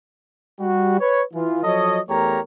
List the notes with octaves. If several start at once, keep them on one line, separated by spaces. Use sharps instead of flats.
G3 F#4
B4 C#5
E3 F4
F3 F#3 A4 C#5 D#5
E2 A3 G4 A#4 C#5 A#5